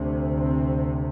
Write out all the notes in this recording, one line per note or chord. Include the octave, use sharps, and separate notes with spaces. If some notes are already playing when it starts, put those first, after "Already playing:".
Already playing: D2 C3
C4